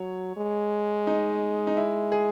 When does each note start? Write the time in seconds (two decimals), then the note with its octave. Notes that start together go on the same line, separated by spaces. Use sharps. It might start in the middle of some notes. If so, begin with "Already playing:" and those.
Already playing: F#3 C#5
0.37 G#3
1.07 D#4
1.67 D#4
1.77 E4
2.12 G#4